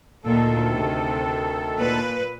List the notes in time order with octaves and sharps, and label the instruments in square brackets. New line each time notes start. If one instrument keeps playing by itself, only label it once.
[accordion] D2 D#3 A4 [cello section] A#2
[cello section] C3
A#2 B4